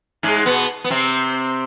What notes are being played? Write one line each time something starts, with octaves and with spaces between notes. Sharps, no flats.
G#2 G#3
B2 B3
B3
C3 C4